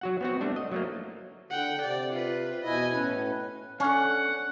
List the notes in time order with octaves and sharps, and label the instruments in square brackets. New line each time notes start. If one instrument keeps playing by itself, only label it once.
[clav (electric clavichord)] F#3 F#4 F#5
B3 C4 F#4
G3 A3 C4 D4
D#5
F#3 A3 A#3
[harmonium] D3 [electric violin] F#5 G5
[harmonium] C3 [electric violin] D5
[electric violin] F4 B4
[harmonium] E2 B2 E4 [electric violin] D#5 G#5
[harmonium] A2 B4 [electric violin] C#4
[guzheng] D3 D4 [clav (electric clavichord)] C#4 [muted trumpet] F#5